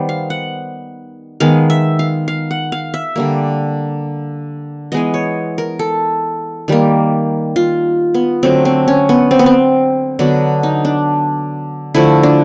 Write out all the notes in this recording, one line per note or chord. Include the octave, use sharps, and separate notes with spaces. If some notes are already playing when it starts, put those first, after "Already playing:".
Already playing: D#3 G3 B3 C5
F5
F#5
D#3 G#3 B3 F5
E5
F5
F5
F#5
F5
E5
D3 G3 A#3
E3 G#3 B3 D#5
C#5
A#4
A4
D#3 G3 A#3
F4
B3
D3 F#3 A3 C4
C4
C#4
B3
C4
B3
C4
D3 F#3 B3 D4
D#4
D4
D3 F3 A3 E4
D4